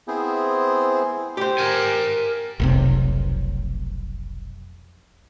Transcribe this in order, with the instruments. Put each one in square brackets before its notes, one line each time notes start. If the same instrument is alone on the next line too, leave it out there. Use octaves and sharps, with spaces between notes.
[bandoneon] B3 C4 E4 G#4 C5
[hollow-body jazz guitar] G4 C5
[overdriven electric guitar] A#4 G#5
[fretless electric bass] F1 B1 C3